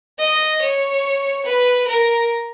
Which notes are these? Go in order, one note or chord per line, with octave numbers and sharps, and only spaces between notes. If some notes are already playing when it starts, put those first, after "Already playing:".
D#5
C#5
B4
A#4